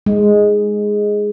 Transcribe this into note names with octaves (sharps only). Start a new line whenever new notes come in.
G#3